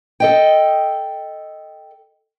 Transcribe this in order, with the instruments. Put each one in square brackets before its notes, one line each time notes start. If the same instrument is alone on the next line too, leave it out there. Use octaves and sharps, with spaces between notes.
[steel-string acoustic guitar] A4 D#5 G5